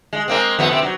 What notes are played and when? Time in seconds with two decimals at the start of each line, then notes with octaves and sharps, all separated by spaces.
0.13 G#3
0.28 G#3 A#3 C4
0.59 F2 B3
0.71 C3 C4
0.83 F#3